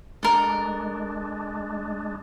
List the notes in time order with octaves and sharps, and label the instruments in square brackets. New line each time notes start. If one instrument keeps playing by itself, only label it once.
[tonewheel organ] G#3 D4 [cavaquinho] A4 A#4